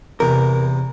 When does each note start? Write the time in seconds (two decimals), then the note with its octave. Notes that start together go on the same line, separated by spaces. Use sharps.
0.20 E2 C3 E3 A#4